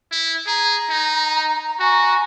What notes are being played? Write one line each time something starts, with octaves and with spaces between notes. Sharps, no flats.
E4
G#4 A#5
D#4
F#4 G#5 A#5 C#6